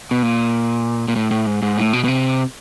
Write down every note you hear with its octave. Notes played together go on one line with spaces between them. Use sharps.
B2
A#2
A#2
A2
A2
G#2
G#2
A2
B2
B2
C3